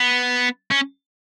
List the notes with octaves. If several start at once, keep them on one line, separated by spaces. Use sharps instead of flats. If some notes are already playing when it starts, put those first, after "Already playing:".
Already playing: B3
C#4